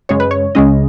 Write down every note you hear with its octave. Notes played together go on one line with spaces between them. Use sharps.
F#2 C#3 G#3 C#5
B4
C#5
C#2 C#3 G#3 C#4 D#5